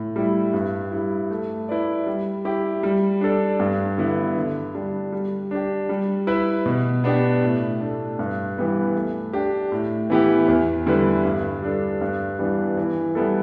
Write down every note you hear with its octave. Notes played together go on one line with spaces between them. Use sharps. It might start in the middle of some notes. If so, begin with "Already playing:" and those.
Already playing: A2
G3 E4
G2
G3 E4
A3
E4 B4 D5
G3
E4 G4
G3
D4 A4 D5
G2
D3 B3 E4
D3
G3 D4
G3
D4 G4
G3
E4 B4 E5
B2
B3 D4 G4
A2
A3 D4
G2
E3 G3 B3 G4
A3
D4 G4
A2
E3 B3 E4 G4
E2
D3 G3 E4 B4
G2
G3 D4 A4
G2
E3 G3 B3 D4
E3
G3 B3 E4 A4